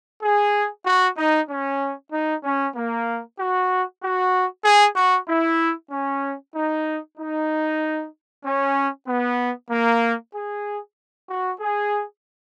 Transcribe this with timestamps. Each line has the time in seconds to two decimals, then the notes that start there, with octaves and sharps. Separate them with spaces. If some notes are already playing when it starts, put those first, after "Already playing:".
0.23 G#4
0.86 F#4
1.17 D#4
1.49 C#4
2.12 D#4
2.44 C#4
2.76 A#3
3.39 F#4
4.02 F#4
4.65 G#4
4.96 F#4
5.29 E4
5.91 C#4
6.54 D#4
7.18 D#4
8.44 C#4
9.07 B3
9.71 A#3
10.35 G#4
11.29 F#4
11.60 G#4